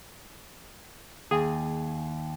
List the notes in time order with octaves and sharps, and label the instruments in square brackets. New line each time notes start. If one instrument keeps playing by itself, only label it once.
[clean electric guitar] D#2 [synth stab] G#4